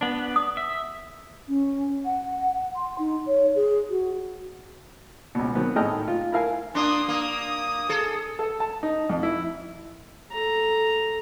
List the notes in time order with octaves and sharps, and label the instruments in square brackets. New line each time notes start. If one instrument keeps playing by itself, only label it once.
[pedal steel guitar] B3 D4
[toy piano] D#6
[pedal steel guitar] E5
[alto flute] C#4
F#5
C6
D#4
C#5
G#4
F#4
[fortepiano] C#2 B2
D#3 F#3 B3 C4
G#1 A2 G#4 D#5 G5 F6
F4
E4 A#4 F5 G#5
[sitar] A#3 D4 [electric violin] C6 D#6
[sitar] A#3 [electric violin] D#6
[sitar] G#4 A4
[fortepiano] A4
A5
D#4
F2
E4
[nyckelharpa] A4 A#5